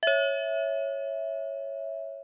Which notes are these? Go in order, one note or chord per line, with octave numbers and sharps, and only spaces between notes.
C#5 E5